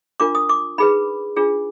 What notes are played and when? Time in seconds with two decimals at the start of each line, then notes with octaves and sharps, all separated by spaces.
0.20 D4 F4 A#4 D6
0.35 D#6
0.49 D6
0.78 D#4 G#4 B4 B5
1.36 D4 F4 G#4